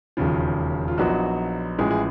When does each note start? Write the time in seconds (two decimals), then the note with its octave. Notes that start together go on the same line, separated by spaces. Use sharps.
0.17 E1 D#2 C#3 F3
0.88 F4
0.98 A#1 A#2 F#3 B3 D#4 F#4
1.78 A1 A2 F3 G#3 G#4
1.91 G#4